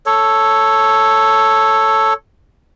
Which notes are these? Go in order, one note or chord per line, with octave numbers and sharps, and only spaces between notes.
A4 C#5